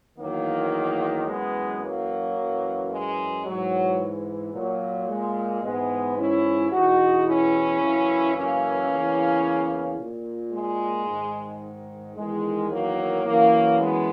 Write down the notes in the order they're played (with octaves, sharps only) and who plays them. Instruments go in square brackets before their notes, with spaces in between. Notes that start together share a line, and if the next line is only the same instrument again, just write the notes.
[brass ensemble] E2 D#3 F#3 A#3
F#2 E3 G#3 B3
F#3 A#3
F#2 E3
G#3
G#2 E3 F#3
A#2 F#3
G#3
G#2 E3 G#3 B3
C#4 E4
E2 B2 D#4 F#4
C#4 E4
F#2 C#3 E3
A#3 C#4
E2 C#3 E3
A#2
G#3
G#2 D#3
E2 D#3 G#3
F#3 A#3
F#2 E3 F#3 A#3
G#3 B3